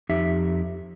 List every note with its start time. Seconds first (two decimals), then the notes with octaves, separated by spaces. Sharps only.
0.09 F2 D#4 G4 E5